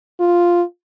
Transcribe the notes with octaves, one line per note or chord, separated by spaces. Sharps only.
F4